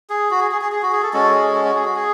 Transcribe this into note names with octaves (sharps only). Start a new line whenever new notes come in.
G#4
F#4
G#4
G#4
G#4
G#4
F#4
G#4
A4
G#3 C#4 F#4 A4
G#4
A4
F#4
G#4
F#4
G#4